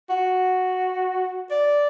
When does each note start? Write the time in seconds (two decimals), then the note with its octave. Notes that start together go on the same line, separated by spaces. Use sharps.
0.10 F#4
1.51 D5